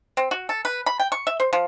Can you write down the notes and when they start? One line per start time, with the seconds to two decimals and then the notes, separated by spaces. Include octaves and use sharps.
0.17 C4
0.31 F#4
0.49 A4
0.65 B4
0.86 B5
1.00 G5
1.12 C#6
1.27 E5
1.40 C5
1.53 F3